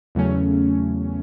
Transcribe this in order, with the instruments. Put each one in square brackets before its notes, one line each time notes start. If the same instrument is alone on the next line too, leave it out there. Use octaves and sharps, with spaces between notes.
[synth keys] E2 C#3 F#3 A3 C#4